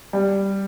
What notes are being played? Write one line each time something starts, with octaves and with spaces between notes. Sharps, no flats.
G3